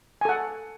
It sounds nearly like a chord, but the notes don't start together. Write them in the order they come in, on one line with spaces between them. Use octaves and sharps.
G#5 A4 F#5